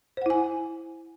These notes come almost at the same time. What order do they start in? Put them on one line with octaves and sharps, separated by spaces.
C5 F#5 E4 G#5